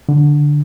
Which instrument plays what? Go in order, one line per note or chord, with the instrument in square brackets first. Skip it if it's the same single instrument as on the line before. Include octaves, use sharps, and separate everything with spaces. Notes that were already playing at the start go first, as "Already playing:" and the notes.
[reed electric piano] D3